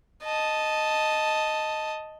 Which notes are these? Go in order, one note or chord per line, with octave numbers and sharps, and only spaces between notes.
D#5 A5